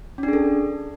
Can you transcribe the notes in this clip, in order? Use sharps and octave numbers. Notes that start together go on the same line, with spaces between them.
C#4
D4
G#4
A4